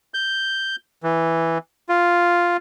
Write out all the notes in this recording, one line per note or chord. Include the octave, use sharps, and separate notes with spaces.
G6
E3
F4